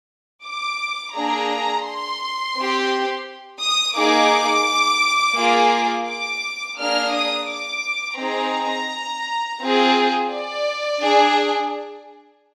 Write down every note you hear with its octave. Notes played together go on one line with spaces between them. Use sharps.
D6
A#3 D4 G#4 A#5
C6
C4 G4
D#6
A#3 D#4 G#4 D6
A#3 F4 G#4
D6
A#3 D4 G#4 F6
D#6
D6
C4 D#4 G#4 A#5
C4 F4 G#4
D5
D4 G#4